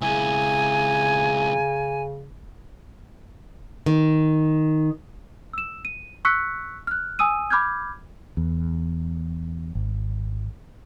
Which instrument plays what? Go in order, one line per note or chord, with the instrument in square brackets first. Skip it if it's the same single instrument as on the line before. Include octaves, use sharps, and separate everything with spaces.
[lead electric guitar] C#2 E4 [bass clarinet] C#3 [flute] G#5
[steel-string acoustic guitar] D#3
[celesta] E6 E7
D#7
C#6 E6 F#6 B6 C#7
F6 F#6
G#5 D#6 E6 D#7
B5 D6 F6 G6 G#6
[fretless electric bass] E2
G#1